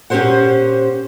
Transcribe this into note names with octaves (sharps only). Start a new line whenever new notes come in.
A#2 C#4 G4 G#4 C5 F#5